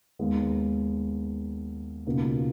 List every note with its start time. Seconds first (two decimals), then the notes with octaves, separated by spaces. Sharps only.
0.19 D#2 D#3 G#3 B3
2.06 C#2 B2 A#3 D#4